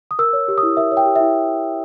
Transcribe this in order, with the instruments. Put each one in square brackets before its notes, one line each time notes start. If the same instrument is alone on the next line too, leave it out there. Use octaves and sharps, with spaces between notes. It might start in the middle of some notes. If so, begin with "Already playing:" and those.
[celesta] D#6
A#4 E6
C#5
G4
D#6
E4
A#4 E5
C#5
G5
G4
E5
E4